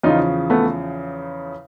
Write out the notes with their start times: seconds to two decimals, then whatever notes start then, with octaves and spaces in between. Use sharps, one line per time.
0.03 E2 C#3 F3 D#4 F4
0.50 A3 B3